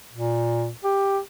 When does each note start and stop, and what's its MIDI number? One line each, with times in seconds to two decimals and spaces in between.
0.13 0.70 46
0.84 1.18 67